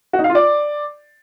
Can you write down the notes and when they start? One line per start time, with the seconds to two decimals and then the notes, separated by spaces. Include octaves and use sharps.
0.13 F#4
0.19 D#4
0.24 F5
0.30 F4
0.35 D5